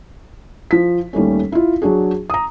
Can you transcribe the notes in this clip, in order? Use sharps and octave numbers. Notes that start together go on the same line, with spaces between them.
F3 B6
D#2 G3 A3 C#4
E4 F4
F#3 D4 F#4 G#4
A#5 D#6